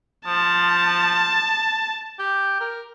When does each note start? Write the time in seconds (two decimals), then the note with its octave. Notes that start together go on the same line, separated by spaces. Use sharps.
0.26 F3 A5
2.19 G4
2.61 A#4